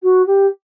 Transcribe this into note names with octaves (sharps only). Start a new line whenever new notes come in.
F#4
G4